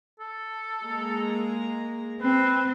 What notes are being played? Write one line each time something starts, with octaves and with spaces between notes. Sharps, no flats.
A4
G#3 A#3 A#5
C4 B4